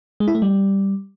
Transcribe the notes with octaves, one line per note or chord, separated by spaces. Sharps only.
G#3
E4
A3
G3